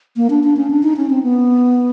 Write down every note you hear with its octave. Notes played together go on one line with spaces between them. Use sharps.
A#3
D4
D4
C#4
D4
D#4
C#4
C4
B3